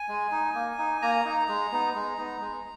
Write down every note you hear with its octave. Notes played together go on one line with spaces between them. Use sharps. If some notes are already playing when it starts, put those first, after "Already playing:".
Already playing: G#5
G#3
D#4
A#3
D#4
A#3 A#5
D#4
G#3
B3 D#4
G#3
B3 D#4
G#3